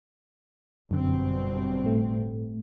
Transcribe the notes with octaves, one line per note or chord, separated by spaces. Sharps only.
G1 F#2 B2 D3 C4
A2 A3